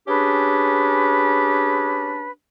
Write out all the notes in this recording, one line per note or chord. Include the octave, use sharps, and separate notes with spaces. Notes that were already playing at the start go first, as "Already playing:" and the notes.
C#4 D4 G4 G#4 B4